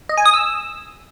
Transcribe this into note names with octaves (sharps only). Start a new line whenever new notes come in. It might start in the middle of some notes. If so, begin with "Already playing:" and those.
D#5
G#5
D#6
E6